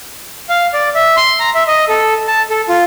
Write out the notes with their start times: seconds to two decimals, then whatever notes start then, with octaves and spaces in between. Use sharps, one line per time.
0.49 F5
0.73 D5
0.95 E5
1.17 C6
1.40 A#5
1.54 E5
1.67 D#5
1.89 A4
2.28 A5
2.50 A4
2.69 F4